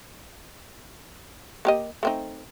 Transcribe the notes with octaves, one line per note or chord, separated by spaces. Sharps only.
A#3 G4 D#5
A3 C4 D#4